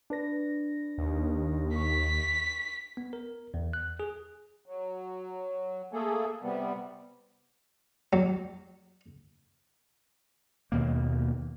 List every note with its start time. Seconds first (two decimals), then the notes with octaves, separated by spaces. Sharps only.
0.10 D4 B4 A#6
0.98 D#2
1.76 C#6 B6
2.97 B3
3.13 A#4
3.54 E2
3.73 F#6
4.00 G#4
4.65 F#3
5.93 A3 A#3 G#4 A4
6.43 C3 G3 B3
8.13 F#3
10.72 D#2 B2 A#3